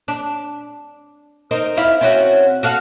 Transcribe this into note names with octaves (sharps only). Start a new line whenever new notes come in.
D4
C4 D#4 A#4
E4 F5
C4 C#4 F#4
F#4 A4 F5